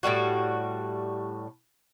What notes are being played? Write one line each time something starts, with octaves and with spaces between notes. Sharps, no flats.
A2 C3 G3 F#4